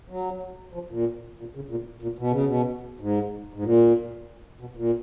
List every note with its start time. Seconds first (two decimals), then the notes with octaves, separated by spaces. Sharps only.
0.10 F#3
0.74 F3
0.90 A#2
1.39 A#2
1.55 C#3
1.70 A#2
2.02 A#2
2.19 B2
2.32 C#3
2.45 B2
3.00 G#2
3.54 G#2
3.64 A#2
4.60 B2
4.77 A#2